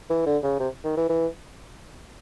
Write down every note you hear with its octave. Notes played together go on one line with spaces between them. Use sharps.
E3
D3
C#3
C3
D#3
E3
E3